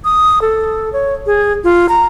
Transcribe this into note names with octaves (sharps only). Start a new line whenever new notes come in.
D#6
A4
C#5
G#4
F4
A#5